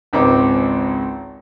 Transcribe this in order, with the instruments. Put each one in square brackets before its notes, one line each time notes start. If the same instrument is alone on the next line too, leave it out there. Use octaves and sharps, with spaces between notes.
[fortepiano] G#1 C#2 G#2 C4 D6